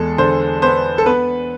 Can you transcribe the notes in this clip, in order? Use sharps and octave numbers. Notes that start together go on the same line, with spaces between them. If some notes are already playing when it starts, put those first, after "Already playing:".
Already playing: E2 G#3 A4
D3 C5
B3 C5
A4
B3 B4